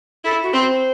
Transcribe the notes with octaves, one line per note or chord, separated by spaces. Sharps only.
E4 A4
F#4
C4 C5